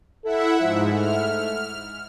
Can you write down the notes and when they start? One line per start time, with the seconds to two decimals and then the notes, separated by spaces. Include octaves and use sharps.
0.24 E4 A4 E5 F#5
0.60 G#2 F3
0.94 A3 F6